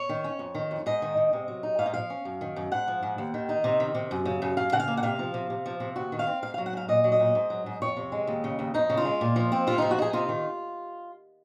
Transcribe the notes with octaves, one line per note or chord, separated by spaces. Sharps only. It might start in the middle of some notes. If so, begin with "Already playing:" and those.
Already playing: C#5
D#3
C#4
F2
D#3
F2
G#2 D#5
D#3
G#2
C3
F#3
D#4
G#2 F5
D#5
F3 F5
C#4
F#2
D#3
F#2
G#2 F#5
F3
G#2
D#2
D#3
D#4
C3
D#3
C3
F#2
C#3
F#2
F#2 F5
C#3 F#5
F5
A#3
F#5
C3 F5
F3
C3
C3
F3
C3
D#2 F#4
D#3
F5
C4
G#2 F5
F#3 F5
F#5
G#2 F5
A#2 D#5
F#3
D#5
A#2
G#2
F#3
G#2
F2 C#5
C3
G#3
D#2
C#3
D#2
F2 D#4
C#3
F4
G#3
A#2
F3
C4
C3 F4
F3 D#4
F#4
D#4 G#4
C3 F4
D#3